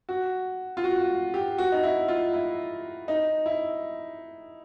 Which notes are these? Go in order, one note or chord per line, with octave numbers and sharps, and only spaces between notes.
F#4
F4
F#4
G4
F#4
D#4
E4
F4
E4
D#4
E4